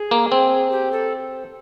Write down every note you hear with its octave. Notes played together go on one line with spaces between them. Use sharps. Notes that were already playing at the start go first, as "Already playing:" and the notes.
Already playing: G#4
A#3
C4
G4
A4